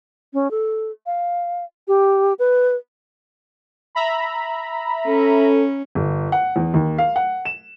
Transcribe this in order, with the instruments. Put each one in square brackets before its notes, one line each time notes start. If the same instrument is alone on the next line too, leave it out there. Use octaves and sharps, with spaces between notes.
[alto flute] C#4
A4
F5
G4
B4
[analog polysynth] E5 A#5 B5
[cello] C#4 [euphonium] A4
[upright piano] G1
F#5
E2
D#2
F5
F#5
E7